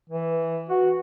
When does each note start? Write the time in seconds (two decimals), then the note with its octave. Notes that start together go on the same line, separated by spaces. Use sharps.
0.10 E3
0.69 F#4